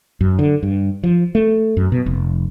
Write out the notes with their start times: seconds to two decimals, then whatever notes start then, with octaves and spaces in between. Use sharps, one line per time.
0.21 F#2
0.39 D3
0.63 G2
1.03 F3
1.35 A3
1.77 F#2
1.92 B2
2.06 F1